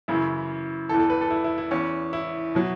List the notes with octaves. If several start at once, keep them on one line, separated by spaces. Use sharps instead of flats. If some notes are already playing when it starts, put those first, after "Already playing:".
F#2 C#3 E3 E4
E2 E3 A4
A4
B4
A4
E4
E4
E4
E2 E3 C#4
E4
B2 F#3